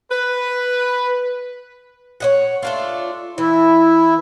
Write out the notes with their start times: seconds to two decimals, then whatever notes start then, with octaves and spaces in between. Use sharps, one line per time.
0.11 B4
2.20 C#5 D#5 F#5
2.63 A3 D4 F4
3.38 E3 E4